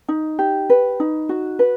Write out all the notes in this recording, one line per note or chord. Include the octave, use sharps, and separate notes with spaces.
D#4
G4
B4
D#4
F#4
B4